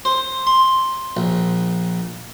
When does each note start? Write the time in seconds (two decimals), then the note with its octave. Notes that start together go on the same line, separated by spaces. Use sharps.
0.05 C5
0.47 C6
1.17 A#1